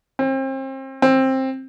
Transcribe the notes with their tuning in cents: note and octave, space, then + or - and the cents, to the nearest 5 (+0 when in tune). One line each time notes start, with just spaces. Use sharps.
C4 +35
C4 +15